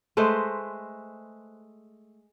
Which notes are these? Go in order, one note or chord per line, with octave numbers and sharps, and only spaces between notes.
G#3 A3 B4 C5